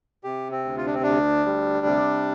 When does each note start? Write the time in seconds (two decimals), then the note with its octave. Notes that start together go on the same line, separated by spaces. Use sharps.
0.24 C3 G4
0.51 C4
0.64 D2
0.78 F4
0.86 D4
0.94 C4
1.02 D2 D4
1.46 G3
1.86 C3